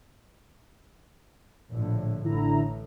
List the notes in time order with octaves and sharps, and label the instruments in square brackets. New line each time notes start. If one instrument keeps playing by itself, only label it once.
[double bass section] A#1 A2 D3
[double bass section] A1 A2 [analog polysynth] D3 E4 A#5